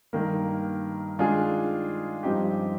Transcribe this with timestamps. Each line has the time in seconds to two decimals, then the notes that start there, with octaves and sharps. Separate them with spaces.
0.13 G2 D#3 A#3
1.18 D#3 G#3 D4 F4 G#4
2.23 G2 F3 C4 D#4 G4